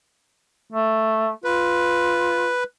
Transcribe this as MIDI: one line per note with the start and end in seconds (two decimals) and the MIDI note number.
0.72 1.31 57
1.44 2.51 65
1.44 2.64 71